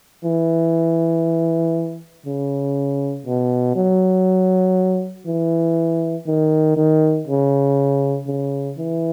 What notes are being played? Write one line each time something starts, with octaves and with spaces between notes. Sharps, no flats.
E3
C#3
B2
F#3
E3
D#3
D#3
C#3
C#3
E3